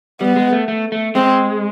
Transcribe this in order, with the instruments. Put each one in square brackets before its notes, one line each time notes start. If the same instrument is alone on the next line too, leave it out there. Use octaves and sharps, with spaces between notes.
[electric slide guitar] G3 [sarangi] B3
[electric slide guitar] G#3
A3
A3
A3
[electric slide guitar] G#3 [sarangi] C4